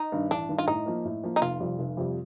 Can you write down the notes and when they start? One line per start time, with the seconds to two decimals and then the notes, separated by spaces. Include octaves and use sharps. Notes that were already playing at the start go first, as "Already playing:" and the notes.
Already playing: D#4
0.12 G2 D#3
0.31 A1 D4
0.49 G2 D#3
0.58 F4
0.68 A2 D#4
0.86 F3 A#3
1.05 A2
1.24 F3 A#3
1.36 D#4
1.42 F1 F4
1.60 F2 C3 G3
1.79 F1
1.97 F2 C3 G3